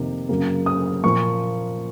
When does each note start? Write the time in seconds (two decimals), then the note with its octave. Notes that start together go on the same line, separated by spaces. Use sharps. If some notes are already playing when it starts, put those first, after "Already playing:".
Already playing: F2 C3 D#3 A#3
0.29 F#2 C#3 F#3 A#3
0.66 D#6
1.04 A#2 F3 A#3 C#6